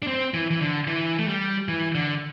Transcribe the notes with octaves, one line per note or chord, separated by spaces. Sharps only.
D4
C4
E3
E3
D3
E3
A3
G3
E3
D3